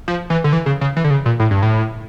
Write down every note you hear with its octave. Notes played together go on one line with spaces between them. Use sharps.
F3
E3
D3
E3
C#3
C#3
E3
D3
C#3
A#2
A2
G2
A2